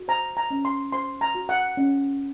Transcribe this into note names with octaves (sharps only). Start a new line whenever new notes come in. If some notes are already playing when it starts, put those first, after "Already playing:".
Already playing: F#4
C5 A#5
A#5
C#4
C6
C5 C6
A#5
F#4
F#5
C#4